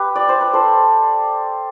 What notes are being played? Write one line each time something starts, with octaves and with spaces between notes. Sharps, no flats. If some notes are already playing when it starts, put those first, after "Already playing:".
Already playing: G4 B4
D5
C5
B4
A4 C5